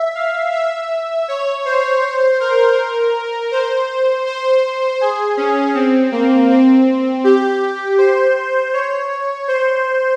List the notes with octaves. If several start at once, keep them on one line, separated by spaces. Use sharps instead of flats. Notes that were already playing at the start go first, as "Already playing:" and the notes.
Already playing: E5
F5
E5
C#5
C5
A#4
C5
C5
G#4
C#4
C4
A#3
C4
G4
C5
C#5
C5